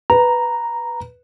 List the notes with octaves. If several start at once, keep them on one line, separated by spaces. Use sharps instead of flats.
B4 A#5